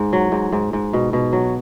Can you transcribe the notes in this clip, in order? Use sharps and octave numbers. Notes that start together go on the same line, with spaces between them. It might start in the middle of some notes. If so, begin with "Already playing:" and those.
Already playing: G#2
F#3
G#2
G#2
G#2
B2
B2
F#3